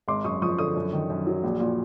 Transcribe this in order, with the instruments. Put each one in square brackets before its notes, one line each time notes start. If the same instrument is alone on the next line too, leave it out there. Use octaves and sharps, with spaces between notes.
[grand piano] G#1 C6 D6
F#2 C#6 D#6
F3 C#6 D#6
D3 C#6 D#6
F#2
D#3
F#2
F#3
A#1
A#2